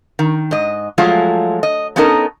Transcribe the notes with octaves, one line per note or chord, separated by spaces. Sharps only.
D#3
G#2 D#5
F3 F#3 G#3 A3 F4
D#5
B3 C#4 D#4 A4 A#4 D#5